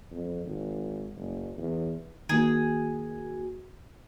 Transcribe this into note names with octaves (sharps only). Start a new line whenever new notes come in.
F2
G#1
F#1
E2
D#3 A#3 F#4 G#4